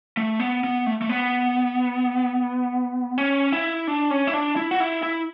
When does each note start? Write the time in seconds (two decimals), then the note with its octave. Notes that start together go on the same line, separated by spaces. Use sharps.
0.17 A3
0.40 B3
0.64 B3
0.86 A3
1.02 A3
1.09 B3
3.18 C#4
3.52 E4
3.87 D4
4.11 C#4
4.27 E4
4.33 D4
4.56 E4
4.71 F#4
4.80 E4
5.03 E4